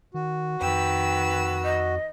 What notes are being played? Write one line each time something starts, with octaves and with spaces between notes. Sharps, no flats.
D#3 F#4
F2 D#3 B4 G5 E6
D#5